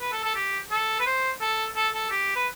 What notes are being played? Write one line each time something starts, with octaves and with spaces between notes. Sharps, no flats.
B4
A4
A4
G4
A4
B4
C5
A4
A4
A4
G4
B4